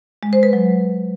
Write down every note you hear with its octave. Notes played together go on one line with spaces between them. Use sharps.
G#3
C5
B4
F#3